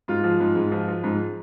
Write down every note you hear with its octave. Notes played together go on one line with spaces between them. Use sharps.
G#2 F4
F3
G#2
G#2
F3
F3
G#2